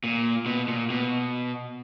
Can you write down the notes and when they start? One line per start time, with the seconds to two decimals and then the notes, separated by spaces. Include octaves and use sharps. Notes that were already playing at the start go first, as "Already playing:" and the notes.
0.04 A#2
0.46 B2
0.68 A#2
0.90 B2